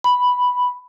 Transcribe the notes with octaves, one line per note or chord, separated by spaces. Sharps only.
B5